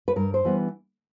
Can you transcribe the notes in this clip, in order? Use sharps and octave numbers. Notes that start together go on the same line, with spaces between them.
B4
G2 A#4
C5
E3 G3 B3